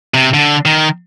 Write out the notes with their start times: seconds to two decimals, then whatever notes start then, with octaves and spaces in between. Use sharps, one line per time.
0.14 C3
0.34 D3
0.65 D#3